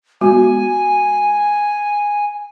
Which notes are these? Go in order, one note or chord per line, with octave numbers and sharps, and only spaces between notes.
G#3 B3 F#4 G#5